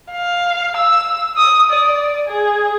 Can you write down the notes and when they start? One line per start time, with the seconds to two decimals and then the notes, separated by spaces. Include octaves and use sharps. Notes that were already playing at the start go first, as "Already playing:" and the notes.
0.11 F5
0.77 E6
1.37 D#6
1.71 D5
2.28 G#4